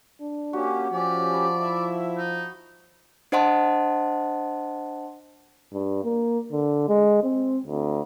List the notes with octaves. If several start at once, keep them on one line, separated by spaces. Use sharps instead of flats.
D4
A#3 C#4 F#4 G4
F3 C#4 G4 D5
A5 B5
E4 E5
D#4
D4 C5 D#5 F#5 A5 C6
G2
A#3
D3
G#3
C4
D2